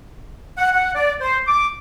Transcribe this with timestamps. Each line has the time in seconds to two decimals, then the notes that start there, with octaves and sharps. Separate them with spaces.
0.57 F#5
0.73 F#5
0.95 D5
1.21 C5
1.47 D6